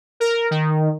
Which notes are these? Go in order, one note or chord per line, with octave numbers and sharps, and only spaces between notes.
A#4
D#3